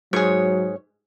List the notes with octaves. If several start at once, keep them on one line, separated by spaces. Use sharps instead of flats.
G#2 F#3 G#4 C#5